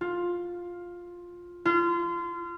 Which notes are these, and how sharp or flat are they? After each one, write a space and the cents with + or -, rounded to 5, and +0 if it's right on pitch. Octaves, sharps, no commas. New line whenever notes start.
F4 +10
F4 -30